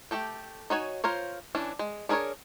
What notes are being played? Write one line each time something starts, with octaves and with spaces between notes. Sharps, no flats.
A3 G4 A4 G5
D#4 F#4 C#5 G#5
F4 A#4 C5 C#5
E3 C#4 D4
G#3
D4 G#4 A#4 B4 C#5